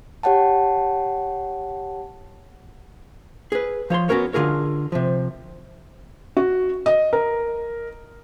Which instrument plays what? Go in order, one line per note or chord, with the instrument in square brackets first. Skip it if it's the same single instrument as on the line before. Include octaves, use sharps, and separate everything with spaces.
[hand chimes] G4 C#5 F#5 G5 A5
[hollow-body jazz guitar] G#4 B4
F3 C#5 A#5 C6
B3 C#4 F#4 A#4 C#5
D3 F4 G#4 A#4 C#5
C3 F3
[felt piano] F#4
D#5
A#4